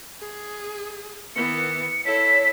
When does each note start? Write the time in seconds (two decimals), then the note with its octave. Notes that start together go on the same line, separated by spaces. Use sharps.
0.19 G#4
1.36 D#3 E3 B3 C#7
2.05 E4 A4 C#5 B6